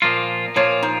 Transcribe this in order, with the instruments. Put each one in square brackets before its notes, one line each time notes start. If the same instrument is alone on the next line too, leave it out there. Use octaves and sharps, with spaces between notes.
[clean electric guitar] A#2 F3 A#3 F4
[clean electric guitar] A#2 F3 A#3 F4 [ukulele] C#5
[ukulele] D#4